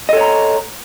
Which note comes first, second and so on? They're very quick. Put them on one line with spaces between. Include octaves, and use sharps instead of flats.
D#5 A4 C#5 A#5